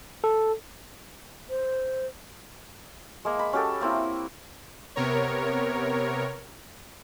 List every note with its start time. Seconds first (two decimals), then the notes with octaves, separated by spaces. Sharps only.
0.24 A4
1.50 C5
3.25 G#3 A#3
3.39 B5
3.53 C#4 F#4 G4 A4
3.81 A#3 C4 E4
4.96 C3 B3 A#4 C#5